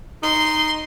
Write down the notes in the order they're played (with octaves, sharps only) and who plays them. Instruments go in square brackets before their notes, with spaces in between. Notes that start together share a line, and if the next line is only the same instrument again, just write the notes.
[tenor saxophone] D#4 [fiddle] C6